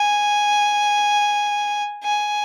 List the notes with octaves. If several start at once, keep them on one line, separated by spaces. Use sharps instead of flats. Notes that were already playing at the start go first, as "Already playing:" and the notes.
Already playing: G#5
G#5